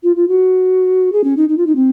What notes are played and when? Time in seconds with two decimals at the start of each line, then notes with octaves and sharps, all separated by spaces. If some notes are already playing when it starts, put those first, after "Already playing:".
0.03 F4
0.16 F4
0.28 F#4
1.13 G#4
1.24 C#4
1.37 D#4
1.49 D#4
1.58 F4
1.67 D#4
1.76 C4